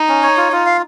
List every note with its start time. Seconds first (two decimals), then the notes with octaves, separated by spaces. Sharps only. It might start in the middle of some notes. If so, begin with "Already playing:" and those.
Already playing: D#4
0.08 C#4
0.23 C#5
0.37 F4
0.52 F4
0.66 F5